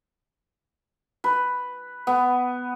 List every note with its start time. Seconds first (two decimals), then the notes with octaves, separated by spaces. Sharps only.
1.24 B4
2.07 B3